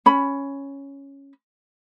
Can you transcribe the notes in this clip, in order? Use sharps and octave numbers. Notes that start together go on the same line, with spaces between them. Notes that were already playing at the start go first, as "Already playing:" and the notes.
C#4 B5